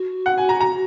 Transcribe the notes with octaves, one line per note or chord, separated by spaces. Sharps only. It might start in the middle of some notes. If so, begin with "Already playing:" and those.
Already playing: F#4
F#5
G#5
A#5
A#5